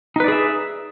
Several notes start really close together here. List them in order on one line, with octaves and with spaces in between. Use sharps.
D#4 B4 D5 G#4 E5